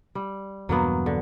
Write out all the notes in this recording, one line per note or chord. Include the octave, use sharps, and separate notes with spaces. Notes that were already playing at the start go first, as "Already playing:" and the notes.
G3
E2 G2 B2 F#3 A#3 B3
D3